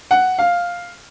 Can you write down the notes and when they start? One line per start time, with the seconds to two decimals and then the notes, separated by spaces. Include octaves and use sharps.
0.11 F#5
0.39 F5